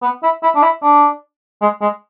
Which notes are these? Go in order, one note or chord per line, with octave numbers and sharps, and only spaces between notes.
B3
E4
E4
D4
E4
D4
G#3
G#3